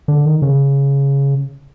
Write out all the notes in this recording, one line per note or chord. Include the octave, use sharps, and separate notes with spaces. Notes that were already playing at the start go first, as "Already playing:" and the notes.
D3
D#3
C#3